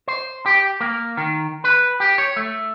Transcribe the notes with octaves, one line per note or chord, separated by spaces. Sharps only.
C5
G4
A#3
D#3
B4
G4
C#5
A3